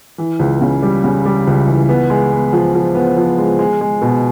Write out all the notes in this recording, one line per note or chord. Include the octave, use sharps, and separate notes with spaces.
E3
C#2
C#3
G3
C#3
G3
C#2
E3
B3
G#3
B3
F3
F3
B3
F3
G#3
G#3
G#3
B2